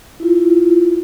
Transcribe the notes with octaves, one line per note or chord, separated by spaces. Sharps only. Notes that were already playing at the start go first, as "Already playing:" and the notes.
E4 F4